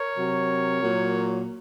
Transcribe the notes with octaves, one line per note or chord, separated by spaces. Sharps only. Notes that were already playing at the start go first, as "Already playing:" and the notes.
Already playing: A#4 C#5
C3 F#3
A#2 F#3